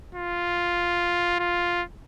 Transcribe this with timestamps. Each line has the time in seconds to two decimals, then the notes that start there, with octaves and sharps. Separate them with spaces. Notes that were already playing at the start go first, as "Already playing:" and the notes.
0.15 F4
1.40 F4